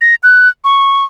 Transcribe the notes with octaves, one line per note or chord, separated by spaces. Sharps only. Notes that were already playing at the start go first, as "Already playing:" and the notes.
A#6
F#6
C#6